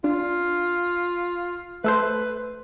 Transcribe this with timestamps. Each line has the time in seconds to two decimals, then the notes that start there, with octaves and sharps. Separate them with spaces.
0.04 D4 F4
1.84 A3 A4 B4 C5